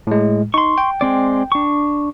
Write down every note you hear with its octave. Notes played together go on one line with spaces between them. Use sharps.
A2 G#3
D#4 C6 C#6
G5
G#3 C4 D5
D4 C#6